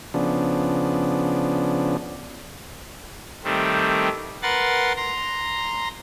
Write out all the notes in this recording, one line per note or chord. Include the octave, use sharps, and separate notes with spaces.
C#3 F3 B3 D4
D#3 G3 A3 C4
A#4 B4 F#5 C6 A6
A#5 C6